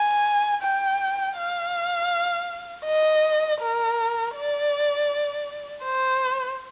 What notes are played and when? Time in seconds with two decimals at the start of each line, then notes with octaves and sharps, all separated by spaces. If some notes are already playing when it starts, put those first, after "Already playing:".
Already playing: G#5
0.62 G5
1.36 F5
2.85 D#5
3.61 A#4
4.35 D5
5.84 C5